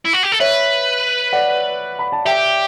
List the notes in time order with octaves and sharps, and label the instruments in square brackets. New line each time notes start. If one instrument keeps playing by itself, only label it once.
[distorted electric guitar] E4
F#4
G4
A4
[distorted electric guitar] B4 [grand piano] C#5 E5
[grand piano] D5 F#5
B5
A5
[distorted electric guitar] G4 [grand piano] E5 G5